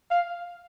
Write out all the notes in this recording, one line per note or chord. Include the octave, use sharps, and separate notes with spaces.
F5